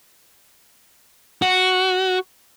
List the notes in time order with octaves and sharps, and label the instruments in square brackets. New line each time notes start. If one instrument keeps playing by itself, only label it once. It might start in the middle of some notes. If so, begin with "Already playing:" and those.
[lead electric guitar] F#4